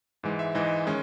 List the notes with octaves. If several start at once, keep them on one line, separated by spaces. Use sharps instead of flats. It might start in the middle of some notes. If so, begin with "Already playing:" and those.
G#2 E3 G#3
E5
G#2 E3 G#3 D#5
D#3 G#3 C#4